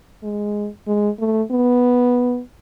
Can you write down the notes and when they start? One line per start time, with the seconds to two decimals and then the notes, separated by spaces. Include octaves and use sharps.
0.23 G#3
0.87 G#3
1.19 A3
1.51 B3